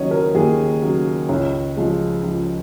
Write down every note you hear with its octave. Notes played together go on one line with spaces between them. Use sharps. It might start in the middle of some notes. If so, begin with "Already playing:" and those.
Already playing: D#2 C#3 F#3 C#5 D#5
A#4
D#2 G#4
C#3 F#3
C#2 C#5
C#3 F3 G#3
C#2